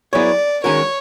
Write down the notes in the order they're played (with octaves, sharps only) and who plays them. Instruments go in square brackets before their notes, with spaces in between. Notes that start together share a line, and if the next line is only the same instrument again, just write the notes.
[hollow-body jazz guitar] F#3 B3 E4 G#4 C#5 [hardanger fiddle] D5
[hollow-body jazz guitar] D#3 G#3 C#4 F#4 A#4 [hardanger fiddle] C#5